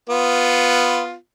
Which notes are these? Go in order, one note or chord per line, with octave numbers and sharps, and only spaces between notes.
B3 F4